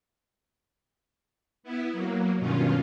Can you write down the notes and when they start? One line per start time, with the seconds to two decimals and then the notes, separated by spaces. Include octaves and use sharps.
1.63 B3 E4
1.93 F#3 A#3
2.38 G2 B2 D#3 C#4 F4